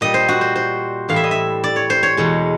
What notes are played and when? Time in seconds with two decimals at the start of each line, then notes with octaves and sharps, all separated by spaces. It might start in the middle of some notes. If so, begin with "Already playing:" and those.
0.01 A#2 G3 D#5
0.14 C5
0.28 F#4
0.41 C5
0.56 C5
1.09 A2 E3 G3 F5
1.16 E5
1.24 D#5
1.31 E5
1.64 D5
1.76 C#5
1.90 C5
2.03 C#5
2.17 E2 B2 G#3